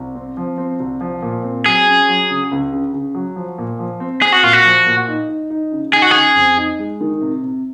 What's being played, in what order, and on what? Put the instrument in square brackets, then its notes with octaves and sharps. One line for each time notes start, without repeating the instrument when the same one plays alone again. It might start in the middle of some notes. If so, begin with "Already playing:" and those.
Already playing: [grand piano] C2
C4
F3
C4
C2
F3
A#2
C4
[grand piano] F#3 [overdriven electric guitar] G#4
[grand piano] C#4
F#3
C#3
C#2
C#3
C#3
F#3
F3
A#2
F3
C4
[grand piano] C4 [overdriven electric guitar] G#4
[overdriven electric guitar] F#4
[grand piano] A#2 [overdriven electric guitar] F4
[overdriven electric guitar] F#4
[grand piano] F3
A#2
D#4
D#4
D#4
C#3
[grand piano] D#4 [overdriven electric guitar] G#4
[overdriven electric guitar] F#4
[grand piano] C#3 [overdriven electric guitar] G#4
[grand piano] F2
D#4
G#3
D#3
C3
C3